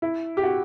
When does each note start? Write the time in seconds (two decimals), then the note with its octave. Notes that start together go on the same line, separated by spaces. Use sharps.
0.02 E4
0.37 G4
0.43 F#4